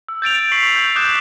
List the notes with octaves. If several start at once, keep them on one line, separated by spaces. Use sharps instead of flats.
E6
G6 A6 D7 F7
D7
C#6 B6 C7 F#7
G6
D6 D#6 F#6 G6 E7 F7